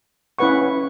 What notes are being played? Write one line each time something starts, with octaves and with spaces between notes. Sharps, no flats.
C#4 E4 B4 F#5 C#6